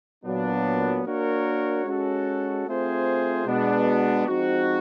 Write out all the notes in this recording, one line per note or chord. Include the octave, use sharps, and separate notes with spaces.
A#2 F#3 B3 D4
A#3 D4 F#4 A#4 C#5
G#3 C#4 F#4 A4
A3 C4 F4 G#4 C5
B2 G#3 B3 D4
F3 G#3 C4 D#4 F#4